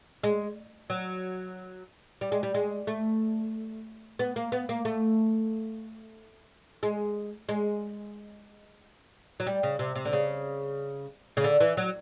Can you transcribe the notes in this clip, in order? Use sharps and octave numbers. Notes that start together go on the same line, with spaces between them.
G#3
F#3
G3
G#3
G3
G#3
A3
B3
A#3
B3
A#3
A3
G#3
G#3
F#3
G3
C#3
C3
C3
D3
C#3
C#3
D3
E3
F#3